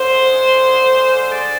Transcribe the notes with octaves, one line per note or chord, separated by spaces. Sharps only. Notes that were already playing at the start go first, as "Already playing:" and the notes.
Already playing: D3 C5
G#3
G#3
D3
D3
G#3
D3
G#3 D5